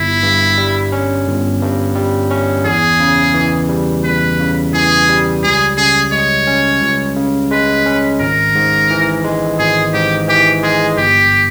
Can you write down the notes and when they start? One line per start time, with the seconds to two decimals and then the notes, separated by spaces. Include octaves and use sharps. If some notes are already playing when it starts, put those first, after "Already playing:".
Already playing: G1 E4
0.23 G2
0.57 G3
0.92 C#4
1.27 G1
1.61 G2
1.95 G3
2.30 C#4
2.65 E2 G#4
3.00 C#3
3.34 E3
3.69 G3
4.04 E2 B4
4.39 C#3
4.73 E3 G#4
5.09 G3
5.43 C#2 G#4
5.77 C#3 G#4
6.12 G#3 C#5
6.47 C#4
6.82 C#2
7.16 C#3
7.51 G#3 B4
7.86 C#4
8.20 G#1 A#4
8.55 G#2
8.90 E3
9.25 G#3
9.59 G#1 G#4
9.94 G#2 G4
10.28 E3 G4
10.63 G#3 G#4
10.97 G1 G4